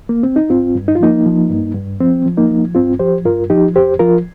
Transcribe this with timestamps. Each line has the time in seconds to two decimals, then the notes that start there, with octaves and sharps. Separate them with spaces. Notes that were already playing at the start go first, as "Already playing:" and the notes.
0.09 A#3
0.23 C4
0.36 D#4
0.50 G2 C4 F4
0.75 G2
0.88 D#4
0.95 F4
1.00 F3 A#3 D#4
1.26 F3
1.50 G2
1.75 G2
2.00 F3 C4
2.25 F3
2.37 A#3 D#4
2.51 F3
2.75 G2 C4 F4
2.99 F3 G4 C5
3.25 G2 F4 A#4
3.50 F3 D#4 G4
3.76 F2 G4 C5
3.99 F3 F4 A#4